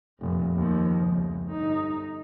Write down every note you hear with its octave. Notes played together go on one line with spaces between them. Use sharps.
F1 A#2
D#2 F3
F1 C#2
G1 D#4